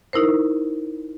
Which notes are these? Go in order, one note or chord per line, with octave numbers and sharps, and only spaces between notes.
D#4 E4 A#4 C5